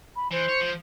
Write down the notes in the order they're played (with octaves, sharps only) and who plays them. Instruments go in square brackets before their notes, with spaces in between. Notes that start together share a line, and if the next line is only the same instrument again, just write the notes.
[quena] B5
[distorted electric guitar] E3 [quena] C5
[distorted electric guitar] C#5
F3